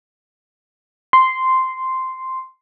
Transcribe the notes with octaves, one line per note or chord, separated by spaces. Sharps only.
C6